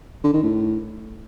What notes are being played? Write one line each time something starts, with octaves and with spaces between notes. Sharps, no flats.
D3
D#3
A2